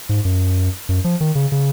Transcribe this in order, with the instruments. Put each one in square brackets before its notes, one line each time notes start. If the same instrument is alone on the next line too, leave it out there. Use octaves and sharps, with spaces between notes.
[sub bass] G#2
F#2
F#2
F3
D#3
C#3
C#3